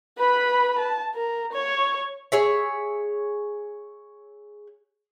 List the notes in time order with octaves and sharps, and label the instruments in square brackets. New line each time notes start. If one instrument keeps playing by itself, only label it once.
[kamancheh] B4 B5
A5
A#4
C#5 C#6
[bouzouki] G#4 C#5 E5